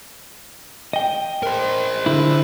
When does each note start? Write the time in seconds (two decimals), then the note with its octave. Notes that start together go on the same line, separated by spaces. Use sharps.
0.93 D#5 G5
1.43 A#4 C5
2.06 D3 E4